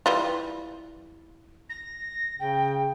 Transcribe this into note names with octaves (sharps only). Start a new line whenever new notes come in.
E3 G3 F4
A#6
C#3 G5